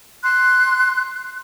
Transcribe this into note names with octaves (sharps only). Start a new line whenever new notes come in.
C6 F#6